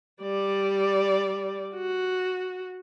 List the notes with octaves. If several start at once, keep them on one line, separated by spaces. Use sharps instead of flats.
G3 D5
F#4